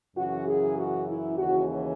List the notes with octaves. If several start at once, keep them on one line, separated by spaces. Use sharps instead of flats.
F#2 C#3 E3 F#4
G#4
F#4
E4
D#2 C#3 E3 F#4